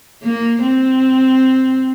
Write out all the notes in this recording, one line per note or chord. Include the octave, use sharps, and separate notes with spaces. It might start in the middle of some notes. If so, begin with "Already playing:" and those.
A#3
C4